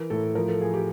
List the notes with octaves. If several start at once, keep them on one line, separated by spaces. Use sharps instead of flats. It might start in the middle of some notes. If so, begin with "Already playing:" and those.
Already playing: E3 A#4
A2 A4
F3 A#4
A4
F3 G#4
G4